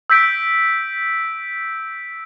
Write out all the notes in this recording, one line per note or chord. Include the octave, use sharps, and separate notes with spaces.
E6 G6 B6 D7